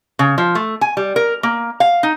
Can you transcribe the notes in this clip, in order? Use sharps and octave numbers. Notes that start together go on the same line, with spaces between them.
C#3
F3
A3
G#5
G3
A#4
A#3
F5
D#4